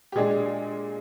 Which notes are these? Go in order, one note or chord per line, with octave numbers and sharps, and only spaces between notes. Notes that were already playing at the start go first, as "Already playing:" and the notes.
G4
A#2 G#3 D4 G#4